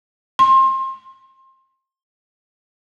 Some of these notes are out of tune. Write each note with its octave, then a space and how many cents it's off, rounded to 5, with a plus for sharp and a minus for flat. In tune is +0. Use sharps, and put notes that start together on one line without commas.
C6 +25